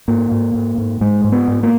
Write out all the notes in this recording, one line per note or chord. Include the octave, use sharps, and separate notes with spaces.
G#2 A#3
G#2
G#2
G#2
G#2 G#3
G#2
B3
G#2
A#3